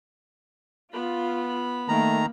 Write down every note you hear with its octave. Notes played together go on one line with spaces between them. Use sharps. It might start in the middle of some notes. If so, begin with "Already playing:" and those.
B3 F4 B5
D#3 A3 A#3 A#5